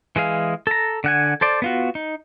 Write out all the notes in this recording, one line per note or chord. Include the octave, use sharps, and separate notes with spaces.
E3 G#3 G#4 F5
A4 A#5
D3 F#5 G#5
A4 C5 D5
B3 F4 F#4
D#4